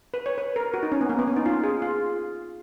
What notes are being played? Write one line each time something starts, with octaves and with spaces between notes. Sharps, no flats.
B4
C#5
B4
A#4
F#4
D#4
C#4
B3
A#3
B3
C#4
D#4
F4
G#4
F4